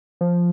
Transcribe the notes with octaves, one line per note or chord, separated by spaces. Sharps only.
F3